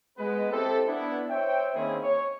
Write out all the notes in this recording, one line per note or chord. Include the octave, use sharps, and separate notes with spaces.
G#3 B3 B4
C4 E4 G4 A4
B3 D4 E4
C5 C#5 E5 G5
D#3 A#3 C4 C#4 E4 G#4
C#5